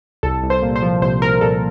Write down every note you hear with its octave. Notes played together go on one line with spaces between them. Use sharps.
C2 A4
C2
C5
A#2
C5
F3
C2 C5
C2 A#4
A#2 A4